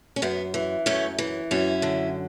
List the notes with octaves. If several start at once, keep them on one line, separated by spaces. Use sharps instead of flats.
C#4
F#2 B3
E3
F#2 A3 C#4
E3
F#2 C#4 E4
D3